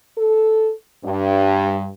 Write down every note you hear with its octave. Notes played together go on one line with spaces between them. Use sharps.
A4
G2